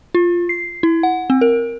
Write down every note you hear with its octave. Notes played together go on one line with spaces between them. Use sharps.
F4
C7
E4
F#5
C4
A#4